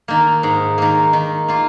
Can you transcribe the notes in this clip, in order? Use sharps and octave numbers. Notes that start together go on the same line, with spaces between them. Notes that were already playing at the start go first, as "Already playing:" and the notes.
D#3 A#3
G#2
D#3 A#3
D#3
A#3 F4